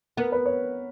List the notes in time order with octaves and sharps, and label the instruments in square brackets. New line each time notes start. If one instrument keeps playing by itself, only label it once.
[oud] B3 [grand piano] A#4
[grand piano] B4
C#5